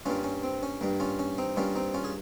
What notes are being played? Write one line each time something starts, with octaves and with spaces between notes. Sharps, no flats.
G2 G3 A#3 C#4 F4
C#4
C4
C#4
G2 G3 A#3
C#4 F4
C#4
C4 D#4
G2 G3 A#3 C#4 F4
C4 D#4
C#4 F4
G#4